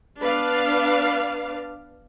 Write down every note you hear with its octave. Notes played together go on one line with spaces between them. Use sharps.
B3 D4 B4 D5 F5